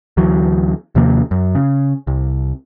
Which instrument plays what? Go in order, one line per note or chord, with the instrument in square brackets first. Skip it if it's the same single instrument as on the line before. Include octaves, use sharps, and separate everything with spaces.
[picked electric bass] D2 E3 F#3
D#2 C3 F3 A#3
F#2
C#3
C2